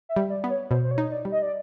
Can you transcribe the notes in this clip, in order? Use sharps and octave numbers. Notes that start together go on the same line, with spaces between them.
E5
G3
D5
B3
C#5
B2 C5
C5
C#5
D#4
D5
G3
D#5
D5